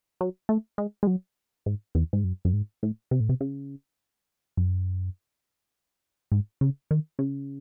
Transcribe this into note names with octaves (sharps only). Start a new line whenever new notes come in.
F#3
A3
G#3
G#3
F#3
G#2
E2
G#2
F#2
F#2
G#2
A2
C3
A2
C3
C#3
F#2
G#2
C#3
D#3
C#3